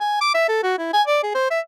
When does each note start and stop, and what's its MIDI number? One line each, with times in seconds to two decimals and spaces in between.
0.01 0.19 80
0.21 0.31 86
0.34 0.48 76
0.49 0.61 69
0.63 0.74 66
0.79 0.91 64
0.93 1.02 80
1.07 1.22 74
1.23 1.35 68
1.35 1.48 72
1.51 1.60 76